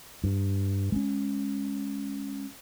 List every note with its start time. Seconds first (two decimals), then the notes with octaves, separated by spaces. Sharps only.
0.24 G2
0.92 G#3 C4 C#4